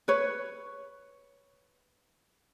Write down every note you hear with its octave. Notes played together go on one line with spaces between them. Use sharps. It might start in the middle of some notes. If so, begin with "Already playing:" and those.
B4 C#5